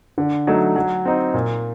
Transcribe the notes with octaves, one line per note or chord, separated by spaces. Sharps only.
D3
F#3 A3 D#4
F#3
C4 D#4
A#2